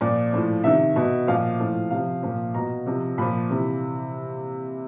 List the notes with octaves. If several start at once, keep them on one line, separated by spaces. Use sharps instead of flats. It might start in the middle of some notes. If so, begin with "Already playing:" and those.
A#2 F3 D5
A2 F3
C3 D#3 E5
B2
A#2 F3 F5
A2 F3
C3 F3 F5
A#2 F3
B2 A#5
C3 F3
A#2 F3 B5
C3 E3